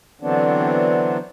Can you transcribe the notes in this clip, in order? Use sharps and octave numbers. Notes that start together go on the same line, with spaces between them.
D3 E3 F#3 B3 C4 D4